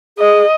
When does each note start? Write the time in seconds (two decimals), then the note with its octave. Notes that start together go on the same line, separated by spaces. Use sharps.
0.18 G#4 D#5